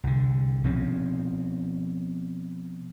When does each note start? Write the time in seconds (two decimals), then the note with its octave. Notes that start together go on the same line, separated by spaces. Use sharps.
0.04 C2 D3
0.64 B2 F3 C4 C#4